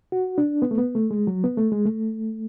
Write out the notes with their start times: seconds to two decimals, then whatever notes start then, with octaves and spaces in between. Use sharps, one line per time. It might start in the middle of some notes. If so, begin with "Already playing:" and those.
0.12 F#4
0.38 D4
0.62 B3
0.71 A3
0.78 B3
0.95 A3
1.11 G#3
1.27 F#3
1.44 B3
1.57 A3
1.72 G#3
1.85 A3